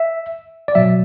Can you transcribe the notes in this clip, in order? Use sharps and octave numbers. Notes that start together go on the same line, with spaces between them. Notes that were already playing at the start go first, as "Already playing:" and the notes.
Already playing: E5
D5
B2 F#3 E5